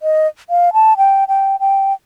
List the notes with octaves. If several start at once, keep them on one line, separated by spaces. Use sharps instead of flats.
D#5
F5
A5
G5
G5
G5